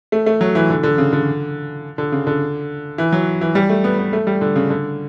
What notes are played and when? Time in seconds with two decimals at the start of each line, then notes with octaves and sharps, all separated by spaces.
0.12 A3
0.26 A3
0.41 F#3
0.55 E3
0.70 D3
0.83 D3
0.98 C#3
1.13 D3
1.98 D3
2.12 C#3
2.27 D3
2.98 E3
3.12 F#3
3.41 E3
3.55 G3
3.69 A3
3.84 B3
3.98 B3
4.13 A3
4.27 G3
4.41 D3
4.56 C#3
4.70 D3